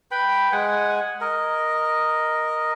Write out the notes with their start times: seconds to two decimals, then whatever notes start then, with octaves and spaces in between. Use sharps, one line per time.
0.11 B4 G5 B5
0.52 G#3 F#5 G#5
1.21 A#4 D#5